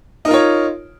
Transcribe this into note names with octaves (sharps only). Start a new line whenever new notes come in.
D#4 F4 A#4 C#5